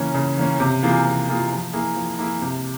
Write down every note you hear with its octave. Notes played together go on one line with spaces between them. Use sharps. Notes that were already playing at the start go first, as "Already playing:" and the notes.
Already playing: C#3 E3 A#3 C#4
C#3
E3 A#3 C#4
C3
E3 A#3 F4 G#4
C3
E3 A#3 F4 G#4
F3
A#3 E4 G#4
F3
A#3 E4 G#4
C3